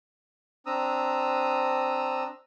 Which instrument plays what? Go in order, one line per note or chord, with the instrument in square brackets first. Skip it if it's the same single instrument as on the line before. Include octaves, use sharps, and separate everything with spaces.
[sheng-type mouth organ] C4 D4 A#5 D#6 E6